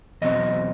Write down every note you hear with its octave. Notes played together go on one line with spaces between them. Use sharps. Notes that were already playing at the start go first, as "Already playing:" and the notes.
E2 B2 F#3 C4 D#5